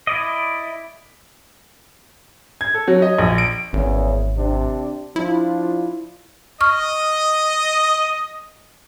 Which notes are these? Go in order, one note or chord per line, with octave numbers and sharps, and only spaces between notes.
E4 D5 D#5
G#6
A4
F#3
D#5
A#1
D7
G#1 E2 A#3 C#4
C3 D4
F3 D4 E4 F4
D#5 C#6 F6